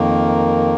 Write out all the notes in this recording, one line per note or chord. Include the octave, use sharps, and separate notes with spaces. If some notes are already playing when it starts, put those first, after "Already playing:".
Already playing: F2 D#3 A#3